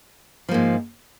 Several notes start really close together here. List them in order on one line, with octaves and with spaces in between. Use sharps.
F3 A#3 G#2